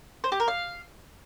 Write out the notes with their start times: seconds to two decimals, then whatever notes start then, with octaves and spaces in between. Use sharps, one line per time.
0.24 C5
0.32 G4
0.40 A#4
0.48 F5